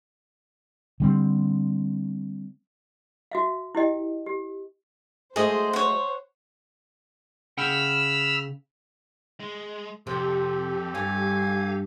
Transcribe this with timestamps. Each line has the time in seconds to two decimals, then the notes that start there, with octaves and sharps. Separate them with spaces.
1.00 D3 G3 C4
3.32 F#4 E5 F5
3.75 E4 G4 D#5 G5
4.26 G4
5.36 F#3 G#3 A3 G#4 C5 D#5
5.73 C#5 F#5
7.58 C#3 F#5 G5 B5 E6 F6
9.40 G#3
10.07 F2 C3 G4 A4
10.95 G2 F5 G#5